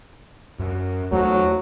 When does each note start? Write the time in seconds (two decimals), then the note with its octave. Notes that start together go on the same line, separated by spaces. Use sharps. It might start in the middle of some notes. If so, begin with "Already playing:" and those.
0.59 F#2
1.12 E2 F#3 A3